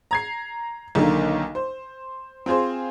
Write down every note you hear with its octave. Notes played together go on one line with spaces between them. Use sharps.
A#5 G#6 C7
B1 D3 D#3 A#3
C5
C4 F4 G#4 C5